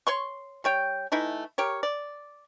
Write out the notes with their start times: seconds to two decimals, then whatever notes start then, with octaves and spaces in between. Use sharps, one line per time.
0.07 C#5 C6 C#6
0.64 G3 C#5 G5
1.12 E3 A3 D#4 E4
1.58 G4 A#4 C#5
1.83 D5